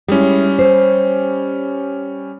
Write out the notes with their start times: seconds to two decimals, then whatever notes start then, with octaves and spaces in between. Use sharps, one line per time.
0.08 G3 G#3 C#4 E4
0.59 C5